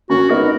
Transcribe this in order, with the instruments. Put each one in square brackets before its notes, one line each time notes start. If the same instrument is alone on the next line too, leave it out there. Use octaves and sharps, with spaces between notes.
[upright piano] A#3 C#4 [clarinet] F#4
[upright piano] B3 D#4 [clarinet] A#4